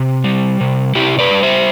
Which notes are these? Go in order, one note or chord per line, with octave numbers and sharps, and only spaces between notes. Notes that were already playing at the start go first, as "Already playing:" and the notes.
Already playing: C3
G3
C3
C3 E4 G4
B4 D5
G3
C5 E5